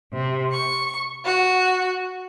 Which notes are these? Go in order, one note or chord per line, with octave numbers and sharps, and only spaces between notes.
C3
C#6
F#4